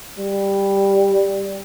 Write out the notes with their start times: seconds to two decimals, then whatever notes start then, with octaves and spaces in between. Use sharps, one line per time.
0.20 G3